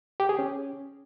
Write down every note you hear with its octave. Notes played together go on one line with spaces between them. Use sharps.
G4
G#4
C#4